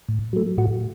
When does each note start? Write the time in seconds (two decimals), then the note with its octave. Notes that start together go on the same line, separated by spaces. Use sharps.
0.09 A2
0.33 F#3 A3
0.57 A2 F#4